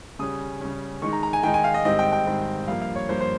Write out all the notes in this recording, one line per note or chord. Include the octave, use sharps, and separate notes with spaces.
C#3 G3 C#4 D#6
C#3 G3 C#4
D#3 G#3 D#4 C#6
A#5
A#5
G#5
D#3 G#3 D#4 G5
G#5
F5
D#5
G#2 D#3 G3 C4 D#5
G5
G5
G#2 D#3 G3 C4
G2 F3 A#3 F5
F5
C#5
G2 F3 A#3 C5
C5